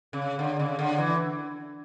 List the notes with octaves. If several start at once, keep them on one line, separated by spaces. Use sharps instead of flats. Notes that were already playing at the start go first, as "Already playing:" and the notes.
C#3
D3
C#3
D3
E3